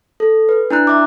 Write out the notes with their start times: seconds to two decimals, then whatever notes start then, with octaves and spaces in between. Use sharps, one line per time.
0.20 A4
0.49 B4
0.70 D4 E4 A#5 F#6
0.87 E5 D6